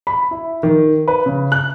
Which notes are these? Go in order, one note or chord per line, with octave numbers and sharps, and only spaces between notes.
B5
E4
D#3
B4
C#3
F#6